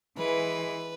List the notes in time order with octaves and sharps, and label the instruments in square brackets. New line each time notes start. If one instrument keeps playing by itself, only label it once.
[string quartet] E3 G#3 [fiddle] B4